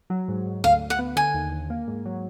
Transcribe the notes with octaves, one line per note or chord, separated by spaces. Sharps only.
F#3
G#2
G#2
D2 F5
D2
F#5
B3
D3 G#5
D#2
D#2
A#3
G#2
F#3